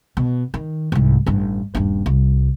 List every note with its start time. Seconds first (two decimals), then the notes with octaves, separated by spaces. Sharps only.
0.17 B2
0.54 D#3
0.92 C2 G#2
1.26 A1 G2
1.75 D#1 G2
2.06 C2